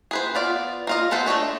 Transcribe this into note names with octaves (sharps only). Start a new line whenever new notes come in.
G#4 B4 C5
B3 F4 D5
A#3 F4 D#5
B3 A4 B4 C5
A3 D4 C#5 D#5